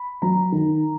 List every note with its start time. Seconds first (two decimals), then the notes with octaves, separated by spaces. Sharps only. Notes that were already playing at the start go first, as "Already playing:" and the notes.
Already playing: B5
0.22 F#3 A#5
0.52 D#3